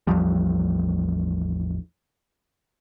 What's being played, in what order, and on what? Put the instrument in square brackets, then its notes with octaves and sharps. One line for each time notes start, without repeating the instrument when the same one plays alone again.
[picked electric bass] A1 E2 F3 G3